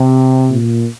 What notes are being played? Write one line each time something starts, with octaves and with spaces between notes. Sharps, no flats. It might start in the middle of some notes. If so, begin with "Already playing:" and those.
Already playing: C3
A#2